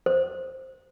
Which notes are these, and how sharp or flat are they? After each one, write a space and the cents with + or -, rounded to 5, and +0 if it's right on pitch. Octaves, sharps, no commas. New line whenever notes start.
C5 +5